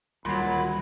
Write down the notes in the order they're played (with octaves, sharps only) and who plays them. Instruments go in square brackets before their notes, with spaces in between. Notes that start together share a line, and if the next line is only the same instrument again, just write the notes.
[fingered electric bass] D2 D#3 G3 [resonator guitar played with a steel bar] A#2 F#3 [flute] B5